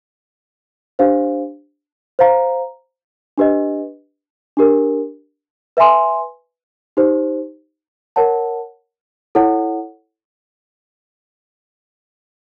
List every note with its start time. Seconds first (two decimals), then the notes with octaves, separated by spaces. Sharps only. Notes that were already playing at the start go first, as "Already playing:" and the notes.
0.99 D4 G4 C5 F5
2.19 C5 F5 A#5
3.38 D4 G4 B4 D#5
4.57 D4 G4 A#4
5.77 B4 E5 G#5 C6
6.97 D#4 G4 C5
8.16 A#4 C#5 F#5 A5
9.35 E4 A4 C#5 F#5